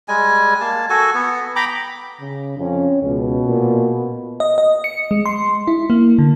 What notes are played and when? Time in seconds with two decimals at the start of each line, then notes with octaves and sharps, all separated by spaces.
0.08 G3 G#3 G#5
0.61 A#3 A5
0.90 F#4 A4 G#5
1.14 B3
1.56 G5 A#5 B5 D6
2.21 C#3
2.58 F2 C#4
3.02 C#2 B2
3.47 A#2
4.40 D#5
4.58 D#5
4.84 C#7
5.11 G#3
5.26 C6
5.67 E4
5.90 A#3
6.19 D3